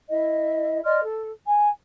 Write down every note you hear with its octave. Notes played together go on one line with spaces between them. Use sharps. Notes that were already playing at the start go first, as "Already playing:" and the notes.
E4 D#5 E5
D5 D#5 C6 F6
A4
G#5